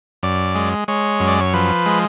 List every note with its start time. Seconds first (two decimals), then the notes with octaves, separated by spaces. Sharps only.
0.23 F#2 D5
0.55 G#3
0.88 G#3 C#5
1.20 F#2
1.27 D5
1.41 C#5
1.53 F3 B4
1.86 G#3